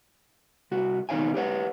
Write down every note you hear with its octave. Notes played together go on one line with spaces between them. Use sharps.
C2 F#4
D#2 B2 D#4 C#5 F5 G#5
G4 B4 C#5 F#5